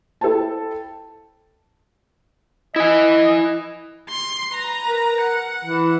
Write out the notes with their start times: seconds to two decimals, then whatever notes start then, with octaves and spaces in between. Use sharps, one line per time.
0.21 E4 A4 C5 G5 A5
2.76 E4 D#5 G#5
4.09 C6
4.53 B4 A#5
4.88 A#4
5.21 F#5
5.65 E3